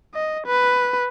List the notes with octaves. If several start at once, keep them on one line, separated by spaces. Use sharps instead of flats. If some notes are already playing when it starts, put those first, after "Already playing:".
D#5
B4